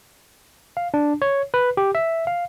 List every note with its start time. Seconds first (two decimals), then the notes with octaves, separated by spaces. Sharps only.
0.77 F5
0.94 D4
1.22 C#5
1.54 B4
1.77 G4
1.95 E5
2.27 F5